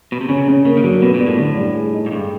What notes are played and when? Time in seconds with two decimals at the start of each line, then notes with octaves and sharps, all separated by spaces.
0.12 B2
0.21 C3
0.29 C#3 C#4
0.48 C#4
0.65 C#3 A#3
0.77 D#3
0.83 D3 F#3
1.02 B2 B3
1.14 A#2
1.20 G3
1.26 A2
1.39 D3
1.57 G3
1.74 G#4
1.93 D#4
2.06 G#2
2.12 G2 G#4